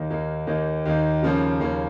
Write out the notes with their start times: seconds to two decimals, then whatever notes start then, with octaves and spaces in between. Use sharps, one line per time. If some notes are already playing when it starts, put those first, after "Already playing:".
Already playing: D#2 D#3 A#3 D#4
0.11 D#2 D#3 A#3 D#4
0.47 D#2 D#3 A#3 D#4
0.86 D#2 D#3 A#3 D#4
1.23 D#2 C#3 F3 A#3 C#4
1.60 D#2 C#3 F3 A#3 C#4